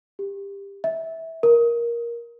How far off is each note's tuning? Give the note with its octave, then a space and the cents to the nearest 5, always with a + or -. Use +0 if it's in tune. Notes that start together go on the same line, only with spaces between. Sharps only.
G4 +20
E5 -15
A#4 +10